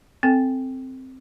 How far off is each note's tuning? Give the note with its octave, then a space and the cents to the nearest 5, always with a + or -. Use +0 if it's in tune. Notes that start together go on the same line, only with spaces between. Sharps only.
C4 +0 A4 +0 G5 +0